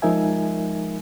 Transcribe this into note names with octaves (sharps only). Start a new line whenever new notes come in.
F3 G#3 D#4 A#4 E5 G#5